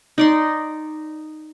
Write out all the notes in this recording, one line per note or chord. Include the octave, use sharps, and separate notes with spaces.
D#4 D5 C6